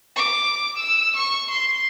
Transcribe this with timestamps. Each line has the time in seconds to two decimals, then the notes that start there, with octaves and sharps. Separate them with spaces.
0.16 D6
0.77 E6
1.16 C#6
1.50 C6